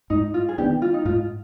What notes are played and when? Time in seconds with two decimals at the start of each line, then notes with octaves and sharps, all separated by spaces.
0.10 G#2 D#4
0.34 F4
0.49 G#4
0.58 D#3 B3 D4 G4
0.82 F4
0.94 D#4
1.05 G#2 F4